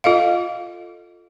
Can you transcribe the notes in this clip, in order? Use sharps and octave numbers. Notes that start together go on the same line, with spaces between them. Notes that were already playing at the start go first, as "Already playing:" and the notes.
F4 A4 D#5 F5